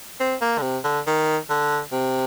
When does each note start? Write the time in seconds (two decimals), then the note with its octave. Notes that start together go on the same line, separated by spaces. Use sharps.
0.20 C4
0.41 A#3
0.58 D3
0.62 C3
0.84 D3
1.07 D#3
1.50 D3
1.92 C3